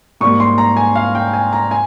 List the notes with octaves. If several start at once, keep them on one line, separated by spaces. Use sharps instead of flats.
G#2 G3 A#3 C#6
C6
A#5
G#5
F5
G5
G#5
A#5
G#5